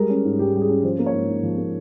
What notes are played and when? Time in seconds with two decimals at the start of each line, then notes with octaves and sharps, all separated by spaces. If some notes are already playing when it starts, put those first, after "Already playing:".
Already playing: G3 G#3 A#4
0.10 C#4
0.25 G#2
0.39 G#2 G4
0.54 G3 G4
0.61 G#4
0.69 C#4
0.84 F3 C5
0.99 A#3
1.06 C#5
1.14 G#2
1.28 G#2
1.43 F3
1.58 A#3